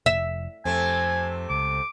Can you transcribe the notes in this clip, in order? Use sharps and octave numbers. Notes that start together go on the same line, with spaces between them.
F1 E5
F2 C3 A3 C4 G#5
C#2 D6